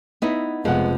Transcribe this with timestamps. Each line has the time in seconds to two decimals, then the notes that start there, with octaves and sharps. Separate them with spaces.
0.22 B3 D#4 E4
0.65 F1 F3 G#3 B3 F#5